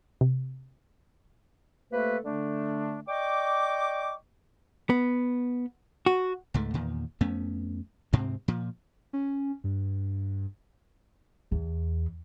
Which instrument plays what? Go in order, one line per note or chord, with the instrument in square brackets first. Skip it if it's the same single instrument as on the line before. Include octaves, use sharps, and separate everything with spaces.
[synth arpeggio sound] C3
[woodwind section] C3 A3 A#3 A4 B4
D3 A3 D4
D5 D#5 G5 C#6 D6
[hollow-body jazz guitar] B3
F#4
[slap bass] C#2 G#2 A3
E2 A#2 D#3
F2 A3 B3 C#4
D2 G#2 C3 C4
A#2 F3
[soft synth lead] C#4
G2
[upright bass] E2